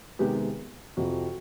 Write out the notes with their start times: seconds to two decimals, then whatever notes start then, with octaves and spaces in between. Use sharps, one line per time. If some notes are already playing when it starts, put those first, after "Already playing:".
0.19 C3 D#3 G#3 B3 G4
0.97 F2 C3 F3 F#4